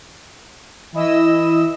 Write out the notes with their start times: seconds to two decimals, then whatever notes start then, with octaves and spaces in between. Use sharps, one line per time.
0.93 E3 E4 D#5 E6